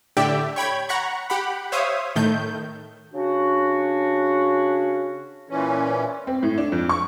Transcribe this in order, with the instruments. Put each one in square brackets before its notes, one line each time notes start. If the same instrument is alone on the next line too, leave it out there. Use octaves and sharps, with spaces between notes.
[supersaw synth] A2 D3 G4 D5 E5 G5
C#5 G5 B5 G#6
F#5 A#5 B5 C#6
G4 F#5 B5
C5 C#5 E5 F5 D#6
A2 D#3 A3 G6
[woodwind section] C#3 D4 F#4
[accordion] A#2 E3 C#4
[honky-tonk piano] C4
A2
D4
F2
C#6